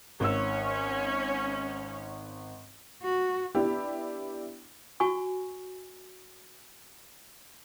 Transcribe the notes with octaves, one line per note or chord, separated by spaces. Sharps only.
G#1 C#4 C#5 E6
F#4
B3 D4 E4 G4
F#4 G#5 C#6